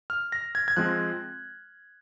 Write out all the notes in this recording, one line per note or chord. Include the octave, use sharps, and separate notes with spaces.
F6
A#6
G#6
G#6
F3 G#3 C4 F#6